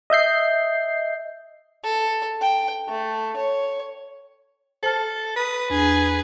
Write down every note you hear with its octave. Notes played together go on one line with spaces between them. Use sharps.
D#5 E5 G6 C7
A4
G5
A3
C#5
A4 C5 A5 F6
B4 D#6
E2 D4 G#4 F#6